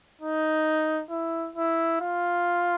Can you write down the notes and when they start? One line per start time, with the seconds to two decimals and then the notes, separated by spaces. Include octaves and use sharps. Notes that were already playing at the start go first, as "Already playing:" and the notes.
0.22 D#4
1.10 E4
1.56 E4
2.01 F4